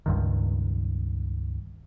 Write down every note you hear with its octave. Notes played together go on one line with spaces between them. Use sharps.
C#2 G2 D#3